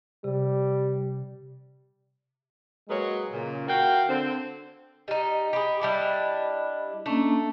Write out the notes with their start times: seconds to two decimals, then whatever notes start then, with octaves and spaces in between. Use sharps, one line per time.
0.24 C3 G3
2.89 F#3 G#3 A#3 G#4 B4 C#5
3.32 A#2 C#3
3.68 F#4 A#4 F5 G5
4.08 D3 C4
5.08 G3 D#4 D#5
5.53 G4 G#4 D#5 B5
5.82 G3 D4 E4
7.06 A3 A#3 C#4 D4